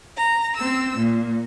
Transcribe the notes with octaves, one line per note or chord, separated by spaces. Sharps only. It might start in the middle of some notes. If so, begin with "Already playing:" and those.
A#5
C4 E6
A#2